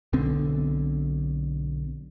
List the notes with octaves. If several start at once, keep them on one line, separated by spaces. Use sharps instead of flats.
B1 B2 D3 C4